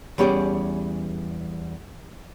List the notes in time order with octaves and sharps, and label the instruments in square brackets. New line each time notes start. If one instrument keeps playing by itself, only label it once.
[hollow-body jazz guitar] E2 G3 C#4 G4 G#4 D5